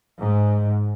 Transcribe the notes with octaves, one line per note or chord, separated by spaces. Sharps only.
G#2